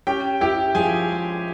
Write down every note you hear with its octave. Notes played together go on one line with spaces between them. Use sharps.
C#4 G4 G5
E4 G4 G5
F3 G#4 G#5
G#3